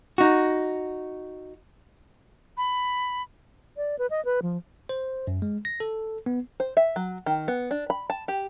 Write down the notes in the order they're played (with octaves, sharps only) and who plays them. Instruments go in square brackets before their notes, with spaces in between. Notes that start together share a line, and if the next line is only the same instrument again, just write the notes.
[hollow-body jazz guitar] D#4 F#4
[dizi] B5
[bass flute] D5
B4
D#5
B4
F3
[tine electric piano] C5
F#2
G#3
A#6
A4
B3
[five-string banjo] C5
E5
F#3
D#3
B3
D4
B5
A5
G4